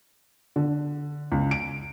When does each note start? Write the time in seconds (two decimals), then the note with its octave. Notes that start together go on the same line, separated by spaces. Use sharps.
0.56 D3
1.31 C#2
1.51 D7